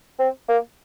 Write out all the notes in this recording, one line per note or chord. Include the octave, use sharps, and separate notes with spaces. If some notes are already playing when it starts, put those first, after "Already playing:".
C4
A#3